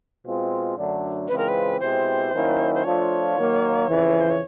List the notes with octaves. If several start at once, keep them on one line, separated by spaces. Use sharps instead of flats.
B2 G#3 C4 F4
F#2 D3 F#3 A3 D4
C#3 E3 G#3 C4 F4 B4
A#4
B4
B2 G#3 C4 E4 G4 C5
D#3 F#3 A#3 C#4 E4
C5
F3 A3 D4 F4 C#5
D#3 F#3 A#3
F2 C#3 E3
C5
C#5